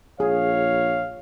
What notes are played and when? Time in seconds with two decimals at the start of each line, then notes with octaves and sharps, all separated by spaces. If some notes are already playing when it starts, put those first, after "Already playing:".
0.20 A#1 G#4 C#5 F5